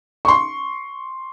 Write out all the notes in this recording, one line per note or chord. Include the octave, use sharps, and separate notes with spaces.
C6 C#6